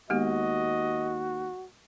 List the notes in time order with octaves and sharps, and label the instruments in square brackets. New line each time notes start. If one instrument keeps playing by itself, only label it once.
[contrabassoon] D#2 [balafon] G#3 B3 G4 [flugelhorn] F#4 [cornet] D#5